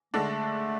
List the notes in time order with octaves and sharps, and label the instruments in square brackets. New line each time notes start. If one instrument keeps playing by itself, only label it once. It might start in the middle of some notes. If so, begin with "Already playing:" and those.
[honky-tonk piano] D3 G#3 D4 A4 [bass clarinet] A3